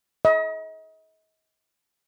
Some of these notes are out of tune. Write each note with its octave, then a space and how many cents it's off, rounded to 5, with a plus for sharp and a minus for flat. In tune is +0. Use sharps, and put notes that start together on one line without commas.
D#5 +40